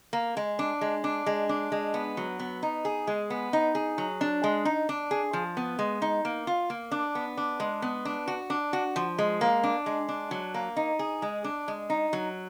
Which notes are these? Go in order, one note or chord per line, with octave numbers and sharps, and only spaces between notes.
A#3
G#3
D4
G#3
D4
G#3
D4
G#3
B3
F#3
B3
D#4
G#4
G#3
B3
D#4
G#4
F#3
D4
G#3
D#4
D4
G#4
F3
B3
G#3
D#4
A#3
F4
A#3
D4
B3
D4
G#3
B3
D4
F#4
D4
F#4
F3
G#3
A#3
D4
G#3
D4
F#3
A#3
D#4
G#4
G#3
D4
G#3
D#4
F#3